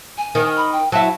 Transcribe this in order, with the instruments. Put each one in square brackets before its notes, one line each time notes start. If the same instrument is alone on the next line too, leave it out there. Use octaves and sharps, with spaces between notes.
[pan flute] G#5
[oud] D#3
[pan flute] B5
G5
[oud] F#3 E4 [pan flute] A5